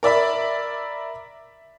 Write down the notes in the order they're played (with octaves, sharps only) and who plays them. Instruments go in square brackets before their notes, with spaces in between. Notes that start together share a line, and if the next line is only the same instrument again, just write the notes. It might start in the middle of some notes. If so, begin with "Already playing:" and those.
[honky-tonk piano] A#4 D5 E5 B5